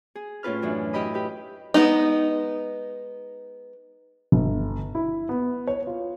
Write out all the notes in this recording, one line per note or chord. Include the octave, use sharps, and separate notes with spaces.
G#4
A2 C#4 F4 B4 F6
F#2 E3 D4
E4 G4 D#5 B5 D#6
G4 B4
G#3 B3 D#4
G1
E4
B3
C#5
F4